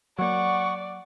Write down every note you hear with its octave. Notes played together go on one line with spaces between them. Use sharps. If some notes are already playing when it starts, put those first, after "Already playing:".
F#3 A#3 D5 F#5 C#6